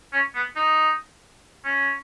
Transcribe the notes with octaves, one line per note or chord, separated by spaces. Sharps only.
C#4
B3
D#4
C#4